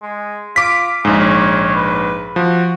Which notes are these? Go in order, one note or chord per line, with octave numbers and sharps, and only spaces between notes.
G#3
F4 D6 B6
A#1 G#2 G#4
C#5
B4
F3 F#4